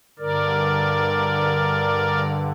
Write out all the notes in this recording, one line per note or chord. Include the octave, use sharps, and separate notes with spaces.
G2 D3 A#4 D5